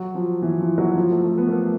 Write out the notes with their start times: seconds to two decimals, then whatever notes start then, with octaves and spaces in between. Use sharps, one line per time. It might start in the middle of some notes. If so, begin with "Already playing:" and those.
Already playing: F#3
0.15 F3
0.42 E3
0.60 F3
0.78 F#3
0.96 F3
1.10 A3
1.24 A3
1.38 B3
1.47 A3
1.51 A#3